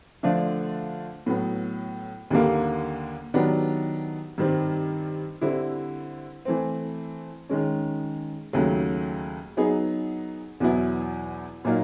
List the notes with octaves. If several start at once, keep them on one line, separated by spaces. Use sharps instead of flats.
D3 F3 A3 D4 F4
A2 F#3 B3
D#2 D3 G3 A#3
D#3 F#3 B3 D4 G4
G2 D#3 G3 C4
D3 G3 C4 E4
E3 A3 C4
D#3 G#3 C#4
D#2 C#3 F#3 A3
F#3 B3 D#4 G#4
E2 B2 F#3 B3 E4
A#2 F#3 A#3 D#4